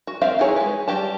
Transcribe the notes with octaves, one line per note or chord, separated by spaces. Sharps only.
F#4
C4 A#4 C5 E5 F5
D#4 E4 G4 G#4 C#5
G#3 B4
G3 F#4 G4 A5